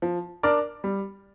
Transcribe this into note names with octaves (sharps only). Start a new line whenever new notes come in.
F3
D4 A#4 D5
G3